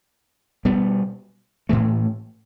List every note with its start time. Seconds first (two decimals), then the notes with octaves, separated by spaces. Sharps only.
0.65 B2 G3 B3
1.69 A2 E3 A3